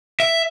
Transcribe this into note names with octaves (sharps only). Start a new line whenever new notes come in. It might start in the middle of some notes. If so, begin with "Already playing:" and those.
E5